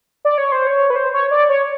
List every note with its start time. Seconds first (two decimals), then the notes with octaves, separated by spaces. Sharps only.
0.25 D5
0.38 C#5
0.52 C5
0.67 C#5
0.90 B4
0.96 C5
1.14 C#5
1.31 D5
1.49 C#5